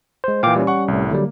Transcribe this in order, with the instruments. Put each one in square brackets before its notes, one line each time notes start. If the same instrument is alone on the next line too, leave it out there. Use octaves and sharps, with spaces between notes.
[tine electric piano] G#3 C5
[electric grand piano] A#2 E3 [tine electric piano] F5 G5 D6
[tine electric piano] G3 C#4
[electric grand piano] F#5 C#6
C2 A2
[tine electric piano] D3 F#3 G3 [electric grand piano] A#3